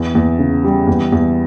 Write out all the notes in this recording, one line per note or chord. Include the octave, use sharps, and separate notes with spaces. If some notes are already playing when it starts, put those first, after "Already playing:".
Already playing: E2
E2
C#3
G3
E2
E2